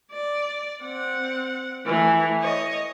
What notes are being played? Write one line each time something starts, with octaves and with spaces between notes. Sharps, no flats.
D5
C4 F#5
E3 A3
C#5 D#5